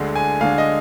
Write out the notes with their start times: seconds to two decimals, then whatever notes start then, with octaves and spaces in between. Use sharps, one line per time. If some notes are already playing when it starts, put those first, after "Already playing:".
Already playing: D2 D3 G#3 D4
0.16 G#5
0.41 D2 D3 G#3 D4 F5
0.58 D#5